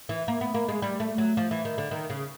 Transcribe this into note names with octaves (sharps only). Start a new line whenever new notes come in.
E3
A#3
B3
A#3
G#3
G3
A3
F#3
F3
E3
D#3
D3
D#3
C#3